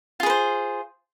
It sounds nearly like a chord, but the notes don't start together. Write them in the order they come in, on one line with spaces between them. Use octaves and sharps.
F4 G#4 B4 C5